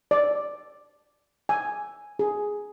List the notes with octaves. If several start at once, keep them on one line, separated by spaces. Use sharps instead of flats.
D5
G#5
G#4